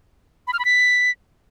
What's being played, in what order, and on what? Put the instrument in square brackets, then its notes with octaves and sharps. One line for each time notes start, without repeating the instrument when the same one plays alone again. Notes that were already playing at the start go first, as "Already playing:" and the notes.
[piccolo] B5
F6
B5
B6